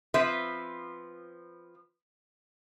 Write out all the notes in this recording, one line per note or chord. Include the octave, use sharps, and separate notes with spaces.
F3 C4 B4 E5